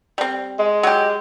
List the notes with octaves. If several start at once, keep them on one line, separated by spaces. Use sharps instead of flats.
G3 C4
G#3
F#3 G4